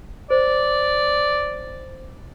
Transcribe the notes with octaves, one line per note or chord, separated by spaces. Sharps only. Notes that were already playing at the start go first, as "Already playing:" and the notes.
C5 D5